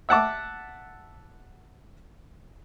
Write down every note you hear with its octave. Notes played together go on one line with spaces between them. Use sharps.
E5 F#5 A5 D6